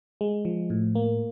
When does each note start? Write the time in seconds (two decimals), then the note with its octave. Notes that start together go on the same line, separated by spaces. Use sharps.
0.21 G#3
0.45 F3
0.70 A2
0.95 A#3